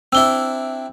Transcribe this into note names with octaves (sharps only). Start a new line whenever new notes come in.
C4 D4 E4 E6 G7